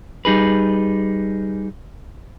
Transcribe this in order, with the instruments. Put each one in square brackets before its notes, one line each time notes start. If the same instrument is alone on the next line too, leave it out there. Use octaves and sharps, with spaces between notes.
[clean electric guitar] G3 D#4 G#4 B4